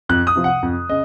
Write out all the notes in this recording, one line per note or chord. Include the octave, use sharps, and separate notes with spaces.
F2 F#6
D#6
C3 F3
F#5
F2
C#3 D#5